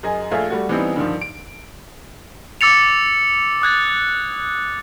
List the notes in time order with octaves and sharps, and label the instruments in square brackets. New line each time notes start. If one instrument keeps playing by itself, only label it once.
[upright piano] F#2 G#4 D#5 G#5
A#1 A3 F4 G#4 E5
G3 A3 F#4
E3 G3 B3 C4 D4 D#4
G2 D3 D#3 F3
D7
[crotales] D6 E6 A6 C#7 F7
D#6 F#6 G#6 A6